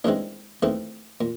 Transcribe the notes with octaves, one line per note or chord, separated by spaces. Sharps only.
D#2 C#3 E3 G#3 C4 D4
D#2 C#3 E3 A3 C4
A#2